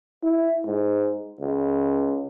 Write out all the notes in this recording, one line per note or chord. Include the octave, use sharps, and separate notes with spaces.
E4
G#2
C#2